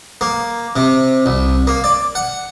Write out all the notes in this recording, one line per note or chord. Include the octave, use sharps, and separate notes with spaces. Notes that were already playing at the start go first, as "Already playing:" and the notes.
A#3
C3
C2
A#3
D5
F#5